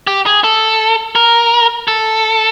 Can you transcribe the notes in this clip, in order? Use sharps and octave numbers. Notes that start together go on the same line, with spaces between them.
G4
G#4
A4
A#4
A4